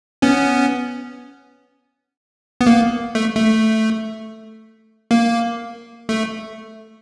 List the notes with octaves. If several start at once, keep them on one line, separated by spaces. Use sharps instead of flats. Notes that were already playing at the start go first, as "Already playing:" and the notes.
B3 C#4
B3
A#3
A3
A3
A#3
A3